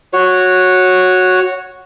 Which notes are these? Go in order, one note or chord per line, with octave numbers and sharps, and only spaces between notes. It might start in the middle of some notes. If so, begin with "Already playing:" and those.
F#4 C#5